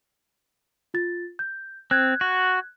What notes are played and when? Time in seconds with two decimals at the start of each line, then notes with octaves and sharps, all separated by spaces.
0.94 F4 A6
1.39 G6
1.91 C4 F#6 G#6
2.21 F#4